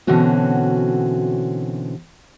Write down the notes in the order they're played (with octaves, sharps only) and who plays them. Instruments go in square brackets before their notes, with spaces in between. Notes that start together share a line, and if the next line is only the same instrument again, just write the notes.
[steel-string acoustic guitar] B2 D3 E3 C4 C#4 F#4